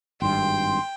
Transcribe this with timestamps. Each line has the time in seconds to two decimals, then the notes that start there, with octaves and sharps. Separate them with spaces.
0.22 G#1 G2 G5 C6